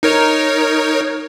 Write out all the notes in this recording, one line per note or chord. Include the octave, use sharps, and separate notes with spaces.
D#4 A#4 C#5